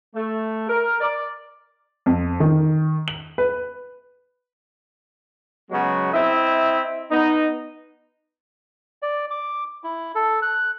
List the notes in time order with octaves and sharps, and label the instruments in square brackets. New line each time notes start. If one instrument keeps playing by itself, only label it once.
[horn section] A3
A#4
D5
[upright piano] F2
D#3
F#7
B4
[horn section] C#3 F#3 G#3 B3 F#4
C4 E4 D#5 E5
B3 D#4
[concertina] D5
D6
E4
A4
F#6